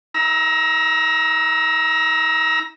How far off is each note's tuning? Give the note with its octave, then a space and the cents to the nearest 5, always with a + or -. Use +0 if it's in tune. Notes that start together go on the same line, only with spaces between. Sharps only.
E4 -45 A#5 +25 E6 +0